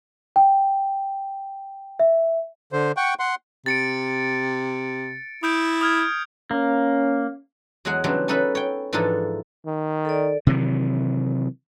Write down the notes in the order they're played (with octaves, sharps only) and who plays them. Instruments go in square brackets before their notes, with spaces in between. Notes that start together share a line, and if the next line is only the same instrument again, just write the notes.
[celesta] G5
E5
[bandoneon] D3 C5
F#5 G5 C#6
F#5 C6
[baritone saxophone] C3 [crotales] A6 C#7 D7
[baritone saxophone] E4 [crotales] D#6 G6 D7
[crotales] D#6 F6 G#6
[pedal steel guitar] A#3 [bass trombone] C#4
[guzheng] E2 F#3 G#3 G#4 F#5
C#3 E3 F#3 G3 D4 C5
C#4 D#4 A4 B4 E5 B5
C#5 G5
G#2 E3 F3 D4 D#4 A4
[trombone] D#3
[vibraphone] A4 D5
[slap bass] C3 D#3 E3 F#3